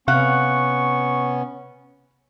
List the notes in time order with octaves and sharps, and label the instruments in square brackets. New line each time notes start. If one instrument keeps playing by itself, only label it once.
[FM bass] C3 [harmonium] B3 C#4 [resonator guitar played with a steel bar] F5 F#5 [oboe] C#6